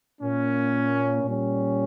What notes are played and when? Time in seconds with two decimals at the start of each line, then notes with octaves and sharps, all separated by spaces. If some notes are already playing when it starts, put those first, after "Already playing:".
0.20 A#2 A#3 C#4
1.24 A#2 G3 C#4